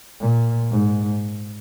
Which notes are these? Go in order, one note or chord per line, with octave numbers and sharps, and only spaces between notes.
A#2
G#2